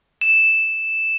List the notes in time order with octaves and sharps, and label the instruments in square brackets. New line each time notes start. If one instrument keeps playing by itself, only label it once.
[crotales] E7